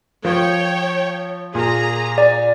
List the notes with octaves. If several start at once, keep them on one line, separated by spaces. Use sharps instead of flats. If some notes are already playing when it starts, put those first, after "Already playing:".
F3 C#5 G5
A#2 G#4 A#5
D5